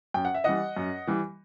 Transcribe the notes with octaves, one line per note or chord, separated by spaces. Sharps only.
F#2 G5
F#5
E5
E3 G3 D#5 F#5
F#2
E3 G3